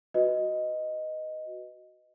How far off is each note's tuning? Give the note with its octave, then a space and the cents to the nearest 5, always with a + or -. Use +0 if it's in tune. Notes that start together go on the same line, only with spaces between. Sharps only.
F#4 +0 B4 +10 D#5 +0